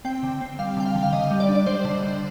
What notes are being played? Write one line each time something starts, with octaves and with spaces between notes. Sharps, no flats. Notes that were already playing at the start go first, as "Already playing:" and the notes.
C4 G5
D3
C4
G3 F5
D3 G5
F5
D3
F5
D3 D#5
G3
D5
D4
D5
G3 C5
D3
G3